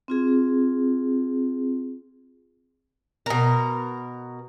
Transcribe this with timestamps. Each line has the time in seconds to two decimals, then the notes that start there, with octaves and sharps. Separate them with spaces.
0.08 C4 F4 G#4
3.26 B2 A#4